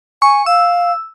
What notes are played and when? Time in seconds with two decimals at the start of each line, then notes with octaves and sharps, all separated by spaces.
0.22 G#5 C#6
0.46 F5 E6